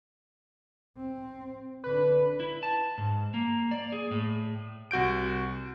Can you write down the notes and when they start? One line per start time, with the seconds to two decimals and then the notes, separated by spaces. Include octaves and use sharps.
0.97 C4
1.84 D3 D4 B4
2.40 E4
2.63 A5
2.98 G#2
3.34 A#3
3.71 D5
3.92 G#4
4.11 A2
4.91 C2 F#4 G6 D7